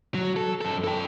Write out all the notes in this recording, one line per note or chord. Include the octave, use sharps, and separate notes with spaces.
F#3
A4
F#2 A4
A4 G5